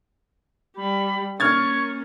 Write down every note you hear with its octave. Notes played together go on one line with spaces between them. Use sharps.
G3 B5
A#3 C#4 C#6 F6 G#6 A6